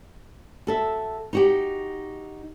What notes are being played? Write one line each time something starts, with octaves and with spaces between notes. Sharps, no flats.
F#4 A4 E5
D#4 F#4 G4